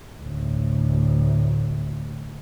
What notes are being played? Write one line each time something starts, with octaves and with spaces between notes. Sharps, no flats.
D2 A2